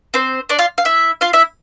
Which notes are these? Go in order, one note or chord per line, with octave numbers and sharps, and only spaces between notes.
C4 C5
D4 D5
F4 F5
F5
E4 E5
F4 F5
E4 E5